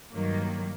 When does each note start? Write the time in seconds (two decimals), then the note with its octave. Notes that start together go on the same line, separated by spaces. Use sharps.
0.13 G2 D#3 F#3 A#3